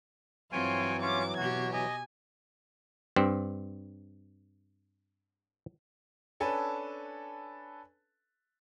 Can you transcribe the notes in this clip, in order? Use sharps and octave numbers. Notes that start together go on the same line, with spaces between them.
G2 E3 F#3 C4 F4 C#5 G5 G#5
C#4 F4 C#5 D6
B2 F#4 G4 G#6
D#5 G#5
G2 C4
C#4 D4 A4 B4 G#5 A5